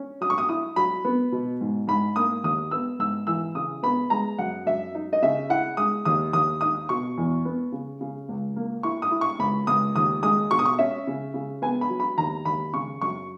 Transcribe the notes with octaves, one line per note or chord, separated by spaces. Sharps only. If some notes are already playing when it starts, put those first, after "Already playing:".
Already playing: C#4
F#3 D#6
C#6
D#6
E4 D#6
F#3 B5
B3
B2
G#2
G#2 B5
A#3 D#6
D#2 D#6
B3 E6
G#2 E6
E3 E6
C#3 D#6
B3 B5
G#3 A#5
F#2 F#5
F#2 E5
D#4
D#5
C#3 E5
E4 F#5
G#3 D#6
D#2 D#6
D#2 D#6
D#4 D#6
B2 C#6
E2
B3
C#3
C#3
C#2
A#3
E4 C#6
D#6
E4
C#6
C#2 B5
C#2 D#6
D#2 D#6
G#3 D#6
B2 C#6
D#6
C#6
C#4 E5
C#3
C#3
B3 G#5
B5
F#3
B5
D#2 A#5
D#2 B5
C#3 C#6
F#2 C#6